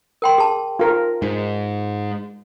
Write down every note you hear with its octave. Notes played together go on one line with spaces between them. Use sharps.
A#4 G5 C6
G#4 A5
F4 A#4
G#2